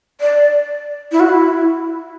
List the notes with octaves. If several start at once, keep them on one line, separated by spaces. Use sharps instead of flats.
D5
E4
F#4
E4